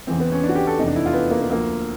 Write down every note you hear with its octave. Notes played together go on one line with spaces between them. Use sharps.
E2 C#3 E3 C4
B3
C#4
D4
F#4
G4
A4
F1 E2 C3 D#4
D4
E4
F4
B3
A#3
B3
D2 D3 F3 A#3